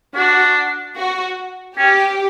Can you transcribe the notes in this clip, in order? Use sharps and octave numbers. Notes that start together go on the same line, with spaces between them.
D4 F#4
F#4
C#4 G4